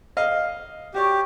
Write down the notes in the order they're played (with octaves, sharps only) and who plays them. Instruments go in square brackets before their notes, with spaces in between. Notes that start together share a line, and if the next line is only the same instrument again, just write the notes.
[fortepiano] D#5 F5
[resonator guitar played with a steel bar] F#4 C#5 D5 [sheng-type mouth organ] G4